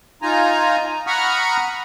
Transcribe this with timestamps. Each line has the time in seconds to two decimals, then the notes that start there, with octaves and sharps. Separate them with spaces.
0.22 D#4 F4 G#5 A#5
1.07 F#5 A#5 B5 C#6 D#6 F6